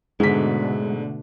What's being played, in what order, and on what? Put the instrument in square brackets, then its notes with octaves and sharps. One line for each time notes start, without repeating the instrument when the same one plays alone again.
[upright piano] G#2 B6 [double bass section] B2 D3 A3 [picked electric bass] G#3